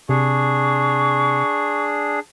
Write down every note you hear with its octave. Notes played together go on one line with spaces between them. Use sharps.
C3 D4 G#4 C#6